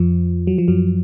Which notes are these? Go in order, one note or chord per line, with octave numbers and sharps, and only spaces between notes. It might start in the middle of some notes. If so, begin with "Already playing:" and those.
Already playing: F2 F3
F#3
F3
F#2 F#3